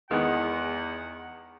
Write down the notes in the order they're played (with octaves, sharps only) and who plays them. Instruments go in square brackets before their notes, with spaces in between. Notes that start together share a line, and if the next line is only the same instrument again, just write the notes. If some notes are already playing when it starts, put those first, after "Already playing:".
[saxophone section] E2 [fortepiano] D#3 G#3 B3 [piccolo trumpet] F#5